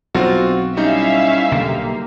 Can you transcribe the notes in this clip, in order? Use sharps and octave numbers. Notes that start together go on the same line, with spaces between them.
B1 C4 F4 F#4
G3 C#4 D#4 E4 E5 F5
B1 D3 A#3 G4